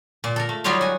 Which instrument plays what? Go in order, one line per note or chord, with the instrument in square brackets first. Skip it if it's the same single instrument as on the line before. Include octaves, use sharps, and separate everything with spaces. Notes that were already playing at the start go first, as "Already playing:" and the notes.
[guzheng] A#2
A4 A#4
A3
F#3 G3 D#4 F4 C#5 F5
F#4 G#5